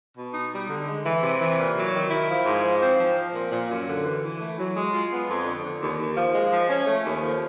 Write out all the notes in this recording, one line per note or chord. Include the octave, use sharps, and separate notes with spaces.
B2
D#4
G3
D3
G#3
E3
C3
E3
A#2
F#3
D#3
E4
F3
G#2
F3
C4
F3
F3
A#2
A#2
F#2
D3
E3
E3
A3
F#3
G#3
F4
B3
F2
D3
D3
D#2
D#2
F3
G#3
F3
C#4
A3
D#2
F3